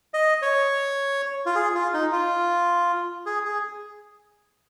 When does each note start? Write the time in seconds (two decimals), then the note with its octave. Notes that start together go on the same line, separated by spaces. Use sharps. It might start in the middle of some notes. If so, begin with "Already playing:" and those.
0.14 D#5
0.42 C#5
1.46 F4
1.55 G#4
1.75 F4
1.94 D#4
2.12 F4
3.26 G#4
3.45 G#4